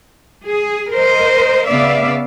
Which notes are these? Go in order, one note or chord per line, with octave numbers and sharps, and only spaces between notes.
G#4
A#4 C5 D#5
C#3 B3 D5 E5 F5